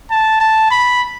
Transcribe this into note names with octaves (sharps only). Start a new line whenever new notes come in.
A5
A5
B5